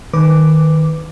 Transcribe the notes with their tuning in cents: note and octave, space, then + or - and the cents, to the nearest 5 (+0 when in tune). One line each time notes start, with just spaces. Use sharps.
D#3 +0 B4 +10 D6 -5